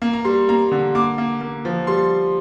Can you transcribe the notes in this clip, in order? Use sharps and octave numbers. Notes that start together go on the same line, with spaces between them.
A#3
A#5
G3 C6
A#3 A#5
D3
A#3 D6
A#3
A#3
F3
G3 C6